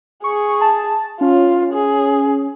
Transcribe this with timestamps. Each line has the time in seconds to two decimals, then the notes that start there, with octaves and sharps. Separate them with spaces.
0.24 G#4 C#6
0.61 A5
1.21 C#4 F4
1.73 G#4